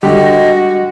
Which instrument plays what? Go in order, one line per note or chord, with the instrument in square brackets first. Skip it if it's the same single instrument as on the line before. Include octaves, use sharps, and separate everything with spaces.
[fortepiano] D3 G4 [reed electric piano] G3 G#3 [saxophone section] F#4 [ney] D#5